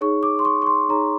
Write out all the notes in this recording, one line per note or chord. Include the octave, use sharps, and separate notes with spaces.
D#4 G#4 C#5 C#6
D6
C6
C#6
C#6
C6
D#4 G#4 C#5 A#5